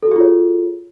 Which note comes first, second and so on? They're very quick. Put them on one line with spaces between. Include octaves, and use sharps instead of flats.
A4 F#4 G#4 F4 C#5